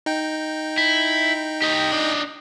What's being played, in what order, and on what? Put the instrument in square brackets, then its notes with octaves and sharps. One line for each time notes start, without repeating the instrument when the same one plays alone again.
[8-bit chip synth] D#4 G5
[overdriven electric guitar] E4
G4 D#5
D4 D#5